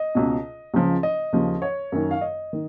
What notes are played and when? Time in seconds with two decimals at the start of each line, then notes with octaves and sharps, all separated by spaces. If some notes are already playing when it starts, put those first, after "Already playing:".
Already playing: D#5
0.15 C#2 B2
0.74 C#2 C#3 F3
1.03 D#5
1.33 D#2 C#3 F3
1.62 C#5
1.92 F#2 D#3
2.11 F5
2.21 D#5
2.53 D#3